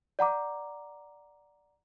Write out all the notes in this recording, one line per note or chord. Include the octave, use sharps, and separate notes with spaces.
D5 F#5 A#5 D6